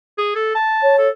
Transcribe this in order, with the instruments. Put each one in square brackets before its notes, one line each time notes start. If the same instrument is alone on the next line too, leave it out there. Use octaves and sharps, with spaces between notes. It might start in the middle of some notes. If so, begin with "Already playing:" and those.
[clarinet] G#4
A4
A5
[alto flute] C#5
[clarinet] A4